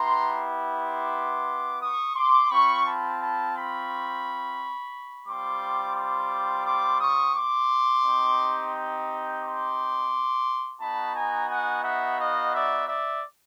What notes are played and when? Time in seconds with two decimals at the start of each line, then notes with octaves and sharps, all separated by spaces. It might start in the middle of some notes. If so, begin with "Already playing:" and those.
Already playing: B3 E4 G4 A#5 C6
0.78 C6 D6
1.82 C#6 D#6
2.16 C6 D6
2.51 C4 F4 B5 C#6
2.85 A5 B5
3.20 A5 B5
3.54 B5 C#6
5.27 G3 C4 F4 C6 D6
5.96 C6 D6
6.65 C6 D6
7.00 C#6 D#6
7.34 C6 D6
8.04 C4 D#4 G4
9.41 C6 D6
10.80 B3 D#4 F#4 A5 B5
11.15 G#5 A#5
11.49 F#5 G#5
11.83 E5 F#5
12.18 D#5 F5
12.53 D5 E5
12.88 D5 E5